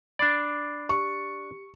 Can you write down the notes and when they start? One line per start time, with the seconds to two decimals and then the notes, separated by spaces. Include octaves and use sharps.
0.19 D4 D5 B5 D6 C7
0.89 G4 C#6 C#7